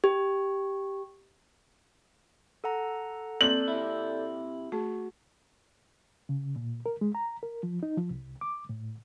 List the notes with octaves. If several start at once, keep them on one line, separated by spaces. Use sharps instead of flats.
G4
A4 F#5 A#5
A#3 C4 A4 D5 G6 F#7
C3 E4
A3 F#4 G#4
C#3
A#2
A#4
G#3
A#5
A#4
F3
D#4
F3
C2
D6
A2